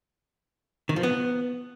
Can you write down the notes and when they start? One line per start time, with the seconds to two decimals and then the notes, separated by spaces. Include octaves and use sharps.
0.89 D#3
0.96 F3
1.03 B3